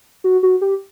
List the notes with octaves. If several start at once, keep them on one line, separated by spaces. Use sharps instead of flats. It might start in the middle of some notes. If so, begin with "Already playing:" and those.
F#4
F#4
G4